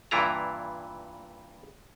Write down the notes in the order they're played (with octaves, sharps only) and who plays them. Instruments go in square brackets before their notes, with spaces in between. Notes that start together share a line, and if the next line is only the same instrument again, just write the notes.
[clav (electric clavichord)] G2 A#2 E3 E4 F4 A#5